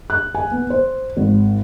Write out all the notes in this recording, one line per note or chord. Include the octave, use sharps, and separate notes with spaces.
F#6
G#5
B3
C5
G#1